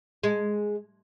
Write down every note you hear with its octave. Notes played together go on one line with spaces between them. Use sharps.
G#3